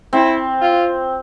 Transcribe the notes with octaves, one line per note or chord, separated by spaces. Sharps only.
C4 E4
F4